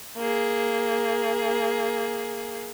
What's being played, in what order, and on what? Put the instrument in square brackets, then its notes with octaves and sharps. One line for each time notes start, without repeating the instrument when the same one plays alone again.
[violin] A#3 G#4